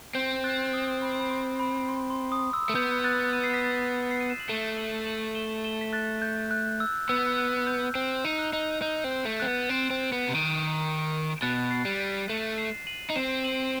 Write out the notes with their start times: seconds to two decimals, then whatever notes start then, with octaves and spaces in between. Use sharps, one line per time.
0.15 C4 G6
0.44 F#6 A6
0.73 D#6
1.02 B5
1.20 B5
1.31 C6
1.60 B5
1.89 C6
2.10 C6
2.32 D#6
2.53 E6
2.69 A3
2.75 B3 G6
3.04 F#6 A6
3.33 D#7
3.44 C7
3.54 B6
3.64 A6 C7
4.11 C7
4.21 D#7
4.30 E7
4.40 F#7
4.48 A3 E7 G7
4.78 D#7 F#7
5.07 D#7 F#7
5.35 E7 G7
5.64 E7 G7
5.81 B6
5.93 F#6 A6
6.22 G6
6.51 F#6
6.80 E6
7.09 B3 E6
7.38 F#6
7.67 G6
7.95 C4 G6
8.25 D#4
8.39 F#6
8.53 D#4
8.82 D#4 G6
9.04 C4
9.11 G6
9.25 A3
9.40 C4 F#6 A6
9.47 B3
9.69 C4
9.90 C4
10.12 B3
10.28 C3
10.34 D#3
11.42 B2 F#6 A6
11.71 A6 C7
11.85 G3
12.00 B6 D#7
12.29 A3 D#7 F#7
12.58 C7 E7
12.87 D#7 F#7
13.10 D#4
13.15 C4 C7 E7
13.44 D#7 F#7